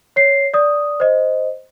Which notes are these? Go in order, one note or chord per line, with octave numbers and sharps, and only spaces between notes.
C#5 C7
D5 D#6
C5 D#5